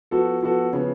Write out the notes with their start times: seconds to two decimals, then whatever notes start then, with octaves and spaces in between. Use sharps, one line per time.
0.11 F3 B3 F#4 A4
0.43 F3 B3 F#4 A4
0.73 C#3 F3 B3